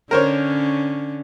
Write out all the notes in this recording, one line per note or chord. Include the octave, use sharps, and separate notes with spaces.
D3 C#4 A#4 C5 C#5